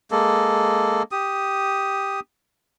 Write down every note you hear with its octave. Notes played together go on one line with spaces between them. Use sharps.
G#3 A#3 A4
G4 D#6